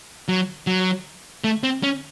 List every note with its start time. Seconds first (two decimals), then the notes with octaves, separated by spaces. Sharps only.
0.28 F#3
0.67 F#3
1.44 A3
1.63 C4
1.83 C#4